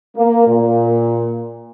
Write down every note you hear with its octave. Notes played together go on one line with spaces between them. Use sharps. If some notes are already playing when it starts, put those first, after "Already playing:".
A#3
A#2